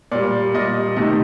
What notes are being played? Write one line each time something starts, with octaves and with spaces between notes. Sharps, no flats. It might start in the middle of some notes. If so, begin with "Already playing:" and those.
A#2 G3 D5
A#2 G3 D#5
C3 D#3 A3 D#5